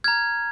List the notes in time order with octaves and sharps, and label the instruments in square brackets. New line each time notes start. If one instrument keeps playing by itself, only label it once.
[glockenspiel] A#5 F6 G#6